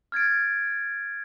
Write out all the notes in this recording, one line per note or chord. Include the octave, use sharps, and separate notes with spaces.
F6 G#6 A6 D7